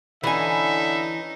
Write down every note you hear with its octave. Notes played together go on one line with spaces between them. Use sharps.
D3 E3 C#4 D#4 E5 G#5